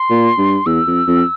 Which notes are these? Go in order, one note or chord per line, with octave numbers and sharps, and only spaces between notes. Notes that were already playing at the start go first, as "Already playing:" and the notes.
Already playing: C6
A#2
G2
E2 E6
F2
F2